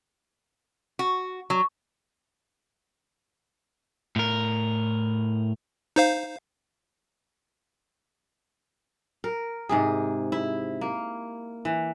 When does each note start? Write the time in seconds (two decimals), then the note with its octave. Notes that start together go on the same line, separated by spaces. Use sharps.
0.99 F#4
1.50 F#3
4.16 A2 A#4
5.96 D#4 C5 F5
9.24 A#4
9.69 G#2 C3 G#4
10.32 E4
10.81 A#3
11.65 E3